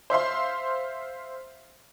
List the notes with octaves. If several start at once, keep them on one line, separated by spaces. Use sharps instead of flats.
C5 E5 F5 C6